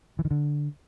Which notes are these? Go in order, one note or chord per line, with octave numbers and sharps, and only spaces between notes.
E3
D#3
D3